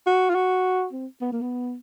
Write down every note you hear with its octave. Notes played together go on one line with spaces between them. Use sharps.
F#4
F4
F#4
C4
B3
A#3
B3